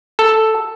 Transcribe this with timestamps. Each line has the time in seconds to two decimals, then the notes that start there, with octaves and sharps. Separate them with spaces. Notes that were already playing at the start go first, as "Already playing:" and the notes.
0.19 A4